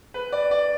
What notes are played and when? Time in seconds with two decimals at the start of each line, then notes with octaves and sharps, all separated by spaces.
0.14 B4
0.32 D5
0.51 D5